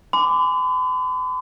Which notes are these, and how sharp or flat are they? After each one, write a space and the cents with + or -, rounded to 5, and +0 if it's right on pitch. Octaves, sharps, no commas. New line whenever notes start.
G#5 +0 B5 +45 D6 +0